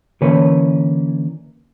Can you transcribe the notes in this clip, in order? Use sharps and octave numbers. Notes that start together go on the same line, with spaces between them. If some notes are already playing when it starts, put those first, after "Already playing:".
D3 E3 A#3 C#4 B4 C#5